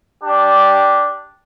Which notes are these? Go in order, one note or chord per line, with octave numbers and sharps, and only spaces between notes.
D4 G4